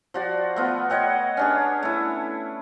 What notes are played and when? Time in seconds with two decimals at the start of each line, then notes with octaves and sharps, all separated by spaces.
0.14 F3 F#4 D5
0.56 A3 B3 F4
0.90 C#5 D#5 F#5 G5
1.37 C#4 D4 G#4
1.83 A3 E4